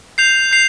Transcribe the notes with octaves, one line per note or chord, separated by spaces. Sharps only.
G6 C7 F7
G6 C7 F7